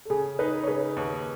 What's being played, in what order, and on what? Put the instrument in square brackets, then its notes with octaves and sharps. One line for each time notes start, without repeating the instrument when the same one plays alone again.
[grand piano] A4
[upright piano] C#3 [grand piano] G#4
[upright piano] D#4 [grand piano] B4
[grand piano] C#5
[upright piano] C#3 [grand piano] B4
[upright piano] D#2